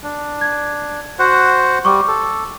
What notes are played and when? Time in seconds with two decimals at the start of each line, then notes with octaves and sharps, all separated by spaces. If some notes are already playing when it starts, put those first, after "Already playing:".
0.03 D4
0.41 G#6
1.19 F#4 C5 F#5
1.85 G3 C#6 D6
2.08 A4